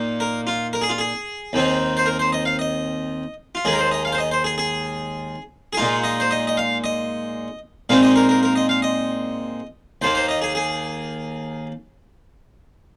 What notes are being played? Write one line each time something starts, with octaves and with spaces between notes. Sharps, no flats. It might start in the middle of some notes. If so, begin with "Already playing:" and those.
Already playing: A#2 A#3 D#4
A#4
F4
A#4
G#4
F4
G#4
D#2 D#3 C4 D#4
C5
A#4
C5
D#5
F5
D#5
F4
D#2 D#3 G#3 G#4
A#4
C5
D#5
F5
C5
D#5
C5
G#4
G#4
G#4
A#2 G#3 D#4 F4
D#5
C5
D#5
D#5
F5
D#5
A#2 G#3 C4 D#4 F5
D#5
A#4
A#4
A#4
D#5
F5
D#5
D#2 D#3 A#3 C5
C5
D#5
G#4
G#4